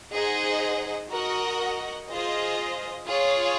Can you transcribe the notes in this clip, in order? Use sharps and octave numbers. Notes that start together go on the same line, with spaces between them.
D#4 G#4 C5 D#5 F#5
F#4 A#4 D#5 F#5
F4 G#4 C5 D#5
F4 G#4 C#5 F5